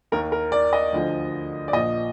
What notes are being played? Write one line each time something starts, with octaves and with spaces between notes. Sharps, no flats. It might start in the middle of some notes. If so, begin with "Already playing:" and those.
D#2 D#3 A#4
A#4
D5
D#5
D2 D3 F3
D5
A#1 A#2 F3 D#5